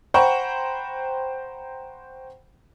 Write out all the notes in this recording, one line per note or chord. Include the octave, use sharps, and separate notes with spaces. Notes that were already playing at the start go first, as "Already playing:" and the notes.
C5 F#5 G5 A#5 B5 C#6